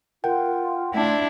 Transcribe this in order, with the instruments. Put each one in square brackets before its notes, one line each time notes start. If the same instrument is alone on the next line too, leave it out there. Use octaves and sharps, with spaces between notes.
[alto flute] F4 [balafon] A#4 [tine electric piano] F#5 G5
[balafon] A3 [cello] D4 E4 [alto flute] A5